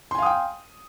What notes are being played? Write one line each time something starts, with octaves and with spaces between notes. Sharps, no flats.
F5 G5 G#5 C6 D#6